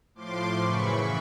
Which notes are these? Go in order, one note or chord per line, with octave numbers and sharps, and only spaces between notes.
A2 F3 C6 D6
F#2 C#3 E3 B5 C#6